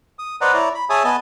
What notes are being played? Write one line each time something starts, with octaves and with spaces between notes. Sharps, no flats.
D#6
B4 C5 D5 D#5 F#5 A#5
E4 C#5 D5 A#5
B5
G#4 C#5 E5 G#5 A5 D#6
B3 D#5 G#5 A5